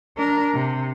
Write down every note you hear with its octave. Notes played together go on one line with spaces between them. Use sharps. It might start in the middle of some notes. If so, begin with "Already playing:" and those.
D4 A#4
C3